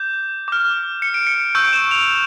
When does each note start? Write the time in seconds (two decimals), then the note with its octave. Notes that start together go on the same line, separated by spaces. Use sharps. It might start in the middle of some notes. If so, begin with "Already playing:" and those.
Already playing: D6 G6
0.48 D6 F6
1.02 C#7
1.14 D7
1.27 C#7
1.55 C#6 E6 G6 D7
1.73 E7
1.91 F7